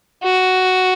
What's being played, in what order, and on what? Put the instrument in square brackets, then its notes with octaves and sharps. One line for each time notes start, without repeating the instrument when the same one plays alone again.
[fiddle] F#4